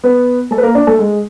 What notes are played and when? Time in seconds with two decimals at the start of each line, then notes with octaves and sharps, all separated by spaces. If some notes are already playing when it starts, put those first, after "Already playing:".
0.04 B3 B4
0.51 A3 A4
0.58 B4
0.63 A#3 A#4
0.75 D4 D5
0.87 A3 A4
0.99 G#3 G#4